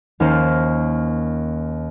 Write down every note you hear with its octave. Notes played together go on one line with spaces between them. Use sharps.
D#2 A#3 C#4 C5 F6 E7